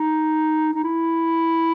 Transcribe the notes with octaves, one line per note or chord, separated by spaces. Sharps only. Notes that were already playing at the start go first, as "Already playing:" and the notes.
Already playing: D#4
D#4
E4